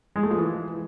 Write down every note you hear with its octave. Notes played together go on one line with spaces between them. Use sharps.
G#3
A3
F3
E3